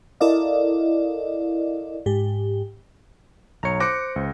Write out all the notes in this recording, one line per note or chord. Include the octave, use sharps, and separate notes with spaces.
E4 A4 A#4 D5 D#5 F5
G#2 G4
B1 C#5 A#5 C#7
C5 D6 F#6 A#6 C#7
C#2